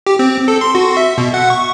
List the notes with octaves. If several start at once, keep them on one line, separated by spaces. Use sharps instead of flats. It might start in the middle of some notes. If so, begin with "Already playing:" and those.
G4
C4
A4
C6
F#4
E5
B2
F#5
C#6